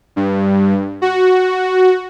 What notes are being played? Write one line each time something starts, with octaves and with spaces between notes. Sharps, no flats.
G2
F#4